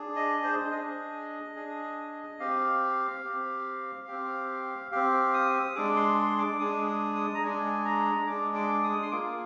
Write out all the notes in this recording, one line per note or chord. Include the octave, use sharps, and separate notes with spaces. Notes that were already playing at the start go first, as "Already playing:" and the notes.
Already playing: D4 G#4
D#5
C5
D4 D#5
G#4
D4 G#4
C4 G4 F5
C4 G4
C4 G4
C4 G4 F5
D#6
G#3 D4 G#4 D6
C6
C6
D6
G#3 D4 G#4 D#6
D#6
D#6
A#5
G#3 D4 G#4 G#5
A#5
G#3 D4 G#4 D6
D6
D#6
C6
A#3 F4 G#4 D6